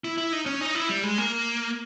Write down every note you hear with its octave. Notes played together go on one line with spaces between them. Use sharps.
E4
E4
D#4
C#4
D#4
E4
G3
G#3
A#3